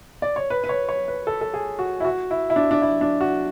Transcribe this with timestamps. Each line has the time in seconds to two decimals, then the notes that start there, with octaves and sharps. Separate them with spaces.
0.22 D5
0.36 C#5
0.50 B4
0.64 B4
0.69 C#5
0.89 C#5
1.08 B4
1.27 A4
1.41 A4
1.54 G#4
1.79 F#4
2.00 E4
2.05 F#4
2.31 E4
2.50 E4
2.56 D4
2.71 D4
2.82 E4
3.01 D4
3.21 F#4